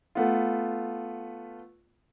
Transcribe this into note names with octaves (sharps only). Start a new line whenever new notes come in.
A3 B3 F4